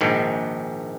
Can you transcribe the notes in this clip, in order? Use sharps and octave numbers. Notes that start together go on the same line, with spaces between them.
A#1 G#2 D#3